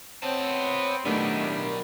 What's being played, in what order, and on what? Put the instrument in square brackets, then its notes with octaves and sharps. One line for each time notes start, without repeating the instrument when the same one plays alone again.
[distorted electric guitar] B3 A5 [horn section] C4 [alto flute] C#5
[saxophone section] A2 G3 D4 [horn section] D#3 [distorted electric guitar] F#3 B3 [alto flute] A3
[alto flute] A#4